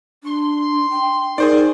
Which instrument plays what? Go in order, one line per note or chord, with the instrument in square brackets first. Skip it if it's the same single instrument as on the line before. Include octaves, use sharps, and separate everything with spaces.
[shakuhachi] D4 [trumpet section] C6
[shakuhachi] G5
[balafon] D#4 [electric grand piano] G#4 C5 D5 [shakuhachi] A#4